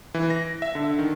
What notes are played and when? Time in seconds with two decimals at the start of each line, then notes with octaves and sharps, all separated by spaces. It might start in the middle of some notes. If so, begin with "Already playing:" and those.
0.14 E3
0.30 A#6
0.62 E5
0.75 D3
0.99 D#3